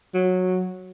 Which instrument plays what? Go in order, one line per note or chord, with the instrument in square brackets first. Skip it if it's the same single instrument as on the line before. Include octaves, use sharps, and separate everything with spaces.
[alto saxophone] F#3